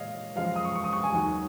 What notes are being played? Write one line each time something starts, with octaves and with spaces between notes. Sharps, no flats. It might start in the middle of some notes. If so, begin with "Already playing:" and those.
Already playing: A#2 G#3 C#5 D#5 F5
F#2 F3 G#3 F5
D#6
C#6
C#6
D#6
C#6
G#5
D#2 D#3 F#3